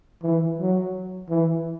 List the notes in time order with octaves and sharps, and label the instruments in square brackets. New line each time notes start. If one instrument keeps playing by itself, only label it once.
[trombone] E3
F#3
E3